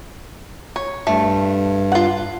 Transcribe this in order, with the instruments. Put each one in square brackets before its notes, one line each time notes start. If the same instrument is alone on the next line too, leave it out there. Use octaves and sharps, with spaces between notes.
[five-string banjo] C#5
[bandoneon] G2 [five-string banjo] A3
[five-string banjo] F4 F#5